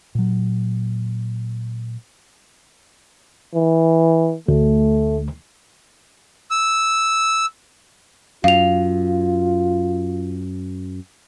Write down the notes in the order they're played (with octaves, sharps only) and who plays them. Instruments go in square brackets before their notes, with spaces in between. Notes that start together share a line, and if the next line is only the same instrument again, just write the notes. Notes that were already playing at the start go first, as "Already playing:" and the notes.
[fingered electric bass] A#2 F#3
[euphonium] E3
[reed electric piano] D2 [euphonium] A3
[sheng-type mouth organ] E6
[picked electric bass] F#2 [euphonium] F4 [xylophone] F5 F7